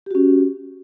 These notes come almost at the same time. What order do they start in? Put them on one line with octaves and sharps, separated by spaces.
G4 F#4 C#4